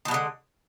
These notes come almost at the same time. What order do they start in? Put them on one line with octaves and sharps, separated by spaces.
D#3 B2 G#3 D3